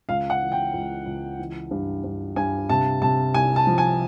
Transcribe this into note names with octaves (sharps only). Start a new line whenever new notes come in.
C#2 F5
F#5
E3
G5
C#2
C#2
E3
G2
G2
G2 G#5
C3 A5
C3 A5
C2 G#5
A5
F3
G#5